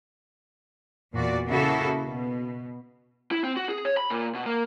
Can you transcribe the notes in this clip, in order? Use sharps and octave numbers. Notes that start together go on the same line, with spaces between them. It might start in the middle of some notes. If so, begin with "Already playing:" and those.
E2 A#2 F#4 D5
C#3 A#3 E4 F#4 A4
B2
E4
C4
F#4
G#4
C#5
B5
A#2
B2
A#3